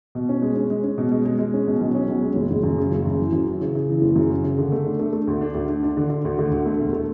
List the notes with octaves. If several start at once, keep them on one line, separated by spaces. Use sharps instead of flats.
B2
C#4
G#3
C#4
G#3
C#4
B2
G#3
G#3
G#3
C#4
B2
B1
C#4
B1
G#3
F#1
F#1
F#2
C#3
F#1
F#2
E3
F#2
E3
C#3
C#3
E3
F#1
F#2
C#3
C#3
D3
A3
D4
A3
A3
D2
D4
D2
D4
D4
D3
D3
D2
D3
D2
A3
E1
A3